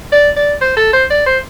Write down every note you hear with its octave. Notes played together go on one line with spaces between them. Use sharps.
D5
D5
C5
A4
C5
D5
C5